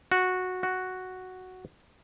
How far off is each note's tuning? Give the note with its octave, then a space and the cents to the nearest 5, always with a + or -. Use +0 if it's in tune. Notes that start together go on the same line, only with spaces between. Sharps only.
F#4 -10
F#4 +0